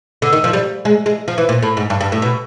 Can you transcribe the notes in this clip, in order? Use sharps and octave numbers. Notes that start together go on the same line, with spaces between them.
D3
D#3
F3
G3
G#3
G#3
F3
E3
A#2
A2
G#2
G2
G2
A2
B2